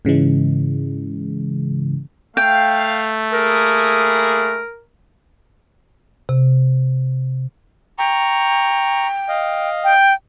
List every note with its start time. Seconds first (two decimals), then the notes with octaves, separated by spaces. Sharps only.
0.05 G#2 C#3 E3 G#3
2.37 A3 F5 G5
3.33 A#3 E4 G#4 A#4
6.29 C3
7.98 G5 A#5 C#6
9.28 D#5 F5
9.84 G5